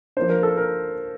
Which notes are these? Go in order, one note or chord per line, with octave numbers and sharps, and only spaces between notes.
F3 A#3 D4 C5
A#4
A4
A#4